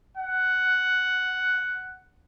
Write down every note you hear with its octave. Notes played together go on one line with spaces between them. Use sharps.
F#5